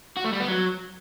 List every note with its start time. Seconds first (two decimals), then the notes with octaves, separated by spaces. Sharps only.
0.17 F#4
0.24 A3
0.32 G3
0.40 B3
0.48 F#3